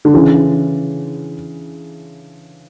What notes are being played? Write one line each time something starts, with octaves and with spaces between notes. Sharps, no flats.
D3
C#3 E3